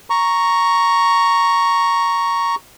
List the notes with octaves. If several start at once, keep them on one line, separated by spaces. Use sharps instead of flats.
A#5 C#6